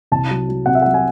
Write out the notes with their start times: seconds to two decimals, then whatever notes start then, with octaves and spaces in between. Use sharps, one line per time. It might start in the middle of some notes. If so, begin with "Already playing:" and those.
0.12 C2 A5
0.31 F#3
0.49 F#3
0.66 C3 F#5
0.75 E5
0.82 F#3 F#5
0.94 G#5